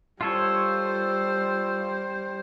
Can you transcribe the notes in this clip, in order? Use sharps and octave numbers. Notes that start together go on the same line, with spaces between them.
G3 F4 A4 C5 C#5